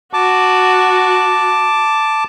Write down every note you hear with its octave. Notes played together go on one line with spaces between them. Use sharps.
F#4 A5 D6